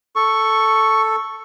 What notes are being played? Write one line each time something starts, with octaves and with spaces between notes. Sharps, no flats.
A4 C#6